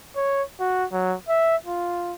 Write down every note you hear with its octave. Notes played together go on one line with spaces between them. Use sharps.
C#5
F#4
F#3
E5
F4